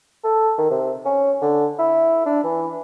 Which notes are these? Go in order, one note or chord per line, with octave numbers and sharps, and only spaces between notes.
A4
D#3
C3
C#4
D3
E4
D4
E3